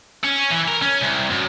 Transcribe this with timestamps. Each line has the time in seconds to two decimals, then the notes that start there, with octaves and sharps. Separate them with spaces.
0.24 C#4
0.51 E3
0.68 A#4
0.82 C#4
1.02 C2
1.30 F#2